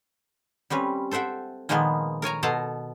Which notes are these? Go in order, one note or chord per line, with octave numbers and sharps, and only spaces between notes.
G3 C4 C#4 B4
A4 C5 E5 F#5 G5
A#2 D#3 F3 G#3 A#3 B3
A#4 C#5 G#5 A#5
B2 A4 A5 A#5 C6